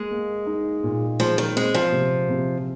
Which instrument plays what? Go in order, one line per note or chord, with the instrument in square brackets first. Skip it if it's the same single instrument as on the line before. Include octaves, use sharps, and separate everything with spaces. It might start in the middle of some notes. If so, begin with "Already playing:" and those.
Already playing: [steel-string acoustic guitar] G#3 [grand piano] A#3
[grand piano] A#3
D#4
A#2
[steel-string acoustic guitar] F3 [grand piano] G#3
[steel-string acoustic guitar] D#3
[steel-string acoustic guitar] G#3 [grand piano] C4
[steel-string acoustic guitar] F3
[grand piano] C3
C3